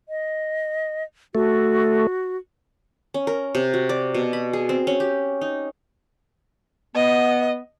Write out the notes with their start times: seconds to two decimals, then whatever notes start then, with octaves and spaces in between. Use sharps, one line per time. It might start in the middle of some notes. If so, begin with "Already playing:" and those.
0.09 D#5
1.35 A3 F#4
3.14 C#4
3.27 A#4
3.55 C3
3.74 F#4
3.89 D5
4.14 B2
4.33 B5
4.53 G#4
4.69 C4
4.87 C#4
5.00 G4
5.41 D#4
6.95 B3 D#5